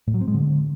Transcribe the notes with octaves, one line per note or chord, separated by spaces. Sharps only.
A2
F#3
C4
G#3
D3